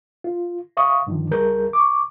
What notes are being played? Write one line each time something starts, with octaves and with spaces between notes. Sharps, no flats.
F4
E5 F5 C#6 D#6
G2 D3 D#3 F3
C#2 G3 G#4 A#4 G6
C#6 D6